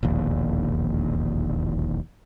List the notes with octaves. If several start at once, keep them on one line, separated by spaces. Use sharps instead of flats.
E1 A#1 D#2